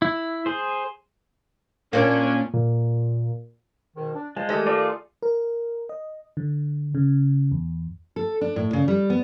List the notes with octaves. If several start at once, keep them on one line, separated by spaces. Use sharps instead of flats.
E4
G#4 C5
A#2 A#3 C#4 D4
A#2
G#2 B2 D#3
D4
G#3 F4 C5 A5
D#3 A3 G4 A4 D#5
F4 G#4 A4 D5
A#4
D#5
D3
C#3
E2
A4
D4
A2
C#3
G3
B3